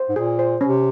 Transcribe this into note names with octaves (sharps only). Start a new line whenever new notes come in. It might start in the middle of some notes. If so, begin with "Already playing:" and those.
Already playing: C5
G#2
A#2 G#4
C5
C3 C#4